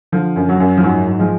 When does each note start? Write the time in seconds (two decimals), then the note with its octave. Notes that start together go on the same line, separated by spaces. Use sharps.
0.12 D3 F3
0.36 F#2
0.49 F#3
0.60 F#2
0.77 F3
0.83 G#2 F#3
1.07 G#2
1.19 F3 G#3